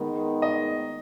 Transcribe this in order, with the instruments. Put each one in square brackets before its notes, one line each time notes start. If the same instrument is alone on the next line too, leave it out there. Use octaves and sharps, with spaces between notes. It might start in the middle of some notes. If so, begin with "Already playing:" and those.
Already playing: [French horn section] D#3 G#3 B3
[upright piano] D#5